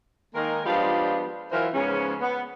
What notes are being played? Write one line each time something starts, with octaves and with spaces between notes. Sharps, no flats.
D#3 G#3 A#3 D#4 A#4
F3 G3 G#3 B3 D4 F4
E3 F#3 E4 F4 A#4 C5
G#2 C#3 F3 B3 C#4
B3